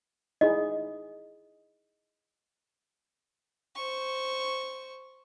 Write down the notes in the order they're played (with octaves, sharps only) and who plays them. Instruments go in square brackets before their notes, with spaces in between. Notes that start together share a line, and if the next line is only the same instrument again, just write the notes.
[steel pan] D#4 E4 G#4 [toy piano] D#5
[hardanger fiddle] C5 C#6